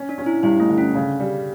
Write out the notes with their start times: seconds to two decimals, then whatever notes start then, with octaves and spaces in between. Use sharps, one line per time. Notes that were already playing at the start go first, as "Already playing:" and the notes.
Already playing: C#4
0.09 D4
0.18 C#4
0.26 E4
0.43 G2 E4
0.60 A3
0.69 D3
0.78 C#4
0.95 C#3
1.20 G3